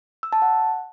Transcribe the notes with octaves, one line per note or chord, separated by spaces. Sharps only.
E6
A5
F#5